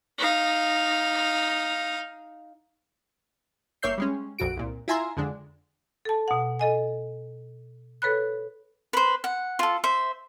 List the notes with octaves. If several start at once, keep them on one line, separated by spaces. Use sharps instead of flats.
D#4 F5
G1 A#3 C#5 E5 G6 C7
G3 G#3 C#4
A#1 F2 F#4 D7
C2 A#2
E4 F4 E5 G#5 A#5 C6
F2 D3 G#3 D4
A4 A5
B2 F#5
A4 D#5 G#5
A4 B4 C#5 B5 F#6
B4 C5
F#5
F4 A4
C5 E5